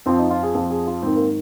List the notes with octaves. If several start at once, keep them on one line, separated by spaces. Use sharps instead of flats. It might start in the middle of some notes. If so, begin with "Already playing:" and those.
F2 F3 C4
D#4
F4
G#4
F2 F3
G#4
F4
G#2 D#3 C4
A#3